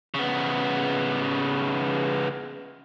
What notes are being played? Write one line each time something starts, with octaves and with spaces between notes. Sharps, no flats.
C#3 B3